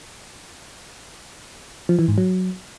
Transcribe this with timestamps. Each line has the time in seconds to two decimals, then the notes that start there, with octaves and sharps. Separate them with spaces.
1.89 F3
1.99 E3
2.08 G#2
2.18 F#3